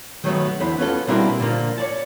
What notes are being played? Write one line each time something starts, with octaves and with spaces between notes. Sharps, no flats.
D#3 F#3 A3 B3
E2 D3 E3 C5 B5
B3 C#4 F4 A4
B2 G3 A#3 C4 D4 E4
A#2 D3 F3 A#3 D4
C#5 D5 A5